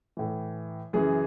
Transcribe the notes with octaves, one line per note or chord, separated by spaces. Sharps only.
A2 E3
F#2 C#3 E3 G#4